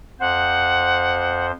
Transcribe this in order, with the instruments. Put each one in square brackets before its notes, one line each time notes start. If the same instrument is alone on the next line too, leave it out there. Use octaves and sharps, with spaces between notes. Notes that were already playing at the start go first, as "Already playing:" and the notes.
[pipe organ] F2 C5 [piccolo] F#5